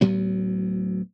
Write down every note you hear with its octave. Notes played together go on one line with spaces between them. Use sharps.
D2 A2 F#3 B3